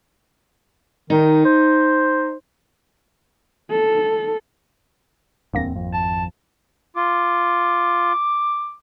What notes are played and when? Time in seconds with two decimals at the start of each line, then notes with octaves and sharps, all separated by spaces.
1.10 D#3 D#4
1.45 C5
3.71 A4
5.54 D1 E2 G2 A#3 C4 A#6
5.74 G#1 F2
5.93 A5
6.96 F4 D6